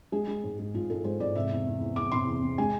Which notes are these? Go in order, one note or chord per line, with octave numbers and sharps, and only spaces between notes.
G#3 G#4
G#3
G#2
G#3
G#2 F4
G#2 A4
G#3 C5
G#2 D5
C3 E5
E2
E2
E2
E2 D6
C3 C6
E2
E2
G#3 G#5